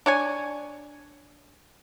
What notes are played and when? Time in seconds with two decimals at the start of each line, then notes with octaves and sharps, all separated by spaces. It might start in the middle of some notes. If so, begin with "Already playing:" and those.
0.06 D4 C#5 G#5